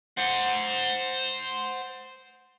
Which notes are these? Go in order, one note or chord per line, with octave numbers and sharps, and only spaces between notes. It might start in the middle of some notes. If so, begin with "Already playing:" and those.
C5 F#5